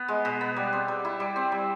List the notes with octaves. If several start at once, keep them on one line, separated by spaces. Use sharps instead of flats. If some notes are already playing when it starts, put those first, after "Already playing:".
Already playing: B3
G#3
B2
B3
G3
C4
G3
E4
G3
C4
G3